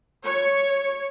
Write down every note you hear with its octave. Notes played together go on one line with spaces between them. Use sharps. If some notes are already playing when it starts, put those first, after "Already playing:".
C#5 C#6